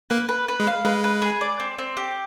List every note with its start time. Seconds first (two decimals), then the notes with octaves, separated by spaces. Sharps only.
0.10 A#3 B4
0.29 B4
0.48 B4
0.60 G#3
0.67 F5
0.85 G#3 B4
1.04 B4
1.22 G#4
1.41 D5
1.60 C4
1.78 C4
1.97 G4